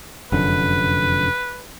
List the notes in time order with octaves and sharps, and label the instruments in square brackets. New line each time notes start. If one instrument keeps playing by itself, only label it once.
[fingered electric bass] F1 F#2 D3 [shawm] B4